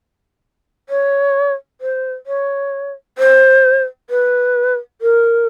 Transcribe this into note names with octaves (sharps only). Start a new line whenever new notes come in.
C#5
C5
C#5
C5
B4
A#4